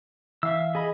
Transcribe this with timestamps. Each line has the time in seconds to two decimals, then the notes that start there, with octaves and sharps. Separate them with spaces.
0.43 E3 E5 F5 E6
0.75 G#4 D#5 B5